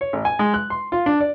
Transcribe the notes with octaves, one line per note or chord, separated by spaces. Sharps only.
C#5
A1
G#5
G#3
F#6
C6
F4
D4
D5